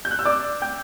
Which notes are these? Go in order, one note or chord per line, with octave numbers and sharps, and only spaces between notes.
G6
F#6
E6
D5 D6
G5 G6